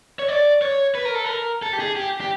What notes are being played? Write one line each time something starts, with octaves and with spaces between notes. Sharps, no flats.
C#5
D5
C#5
B4
A#4
A4
A#4
A4
G4
G#4
G4
G4